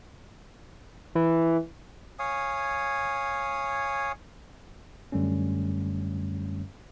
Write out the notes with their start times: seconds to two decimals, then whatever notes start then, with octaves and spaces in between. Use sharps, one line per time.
1.15 E3
2.19 C#5 F5 G#5 D#6
5.12 F#2 D3 G3 A3 C#4